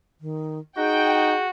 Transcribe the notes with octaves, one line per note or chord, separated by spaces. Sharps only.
D#3
D#4 F#4 G#4 G5